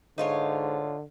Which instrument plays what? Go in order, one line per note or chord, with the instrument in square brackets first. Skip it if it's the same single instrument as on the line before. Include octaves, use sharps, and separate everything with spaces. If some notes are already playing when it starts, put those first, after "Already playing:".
[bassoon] G#2 [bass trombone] D3 [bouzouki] D#4 F4 C#5